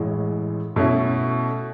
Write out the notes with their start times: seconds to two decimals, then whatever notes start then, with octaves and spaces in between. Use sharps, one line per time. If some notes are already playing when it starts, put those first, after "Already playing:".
Already playing: A1 A2 E3 G#3
0.76 B2 A3 C#4 E4